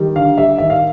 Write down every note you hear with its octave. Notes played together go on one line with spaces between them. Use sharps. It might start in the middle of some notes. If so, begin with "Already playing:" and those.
Already playing: D#3 G3
D3 F5
G3 E5
D#3 E5
F5